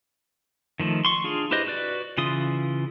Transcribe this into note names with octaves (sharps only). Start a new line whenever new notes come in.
D#3 F3 A3
C6 C#6
D4 F4 G#4
E4 G4 B4 C5 D#5
F#4 B4 D5
C#3 E3 F4 C6 D#6